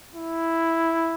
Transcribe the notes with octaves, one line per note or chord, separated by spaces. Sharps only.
E4